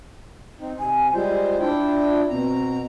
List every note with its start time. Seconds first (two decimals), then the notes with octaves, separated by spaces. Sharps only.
0.60 C4 D#4
0.79 C3 G#5
1.13 G3 G#3 F4 C5
1.60 D4 E4 G5
2.29 B2 C4 A#5